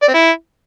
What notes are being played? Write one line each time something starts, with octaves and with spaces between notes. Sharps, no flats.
D5
C4
E4